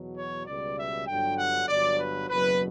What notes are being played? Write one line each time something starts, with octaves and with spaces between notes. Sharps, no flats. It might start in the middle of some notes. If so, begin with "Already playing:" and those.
Already playing: E2 B2 F#3
C#5
C#2 B2 G3 D5
E5
G1 G2 D3 F#3 G5
F#5
G1 G2 F#3 D5
B4
F#1 E2 B2 F#3 B4